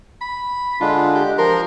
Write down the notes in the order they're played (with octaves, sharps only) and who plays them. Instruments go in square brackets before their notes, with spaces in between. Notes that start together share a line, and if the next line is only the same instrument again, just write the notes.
[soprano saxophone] B5
[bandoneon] D3 G#3 D4 [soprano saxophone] F4
[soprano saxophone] G4
[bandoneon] F3 C6 [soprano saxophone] A#4